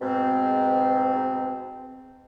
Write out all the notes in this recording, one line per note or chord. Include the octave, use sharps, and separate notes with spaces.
G#2 B2 C4